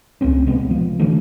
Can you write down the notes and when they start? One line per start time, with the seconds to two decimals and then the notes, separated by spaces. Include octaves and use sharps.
0.21 C#2 A3 C4 C#4
0.46 C3 G#3 B3
0.70 F3
0.99 D3 E3 F#3 A3